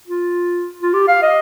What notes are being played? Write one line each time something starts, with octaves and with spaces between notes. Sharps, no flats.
F4
F4
G4
F5
D#5